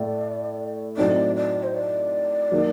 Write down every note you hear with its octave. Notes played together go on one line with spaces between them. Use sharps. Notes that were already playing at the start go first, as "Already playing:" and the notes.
Already playing: A2 A3 D5
A2 F#3 C4 D#4 D5
D5
C5
D5
D#3 F#3 A#3 F#4